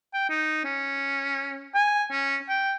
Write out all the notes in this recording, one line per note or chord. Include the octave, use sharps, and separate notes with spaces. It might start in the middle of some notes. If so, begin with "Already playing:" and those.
G5
D#4
C#4
G#5
C#4
G5